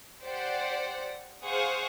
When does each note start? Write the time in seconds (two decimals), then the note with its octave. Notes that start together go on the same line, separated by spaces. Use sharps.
0.24 G4 C5 D5 F#5
1.45 G#4 C5 F5 F#5 C#6 D#6